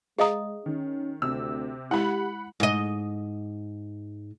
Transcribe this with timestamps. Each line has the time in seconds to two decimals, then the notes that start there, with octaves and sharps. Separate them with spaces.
0.19 G#3 G#4 D#5 F5 A#5 D#6
0.66 D#3 C#4
1.22 D2 C3 E6
1.91 G#3 E4 G4 F#5 B5
2.60 G#2 D#5